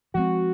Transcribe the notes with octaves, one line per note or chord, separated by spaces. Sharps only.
F3 G#3 C4 F#4